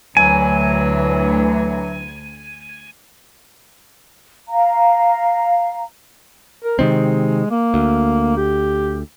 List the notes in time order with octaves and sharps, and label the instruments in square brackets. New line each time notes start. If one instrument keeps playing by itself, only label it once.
[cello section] D2 [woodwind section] E3 F#3 [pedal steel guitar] G#5
[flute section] F5 A#5
[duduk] A#4
[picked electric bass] C3 D#3 C4 [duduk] G#3
[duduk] A#3
[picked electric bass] D2
[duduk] G4